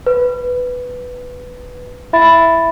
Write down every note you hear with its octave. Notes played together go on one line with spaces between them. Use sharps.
B4
E4 E5 B5 A6